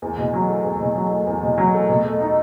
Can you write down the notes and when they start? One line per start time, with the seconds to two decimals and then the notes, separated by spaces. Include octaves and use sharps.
0.02 E2
0.17 B2
0.33 F#3
0.49 A3
0.64 E2
0.80 B2
0.96 F#3
1.11 A3
1.27 E2
1.42 B2
1.58 F#3
1.74 A3
1.89 B2
2.04 A3
2.20 D#4